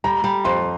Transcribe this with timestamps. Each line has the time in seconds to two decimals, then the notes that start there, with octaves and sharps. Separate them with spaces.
0.04 G3 A#5
0.24 G3
0.44 F2 C6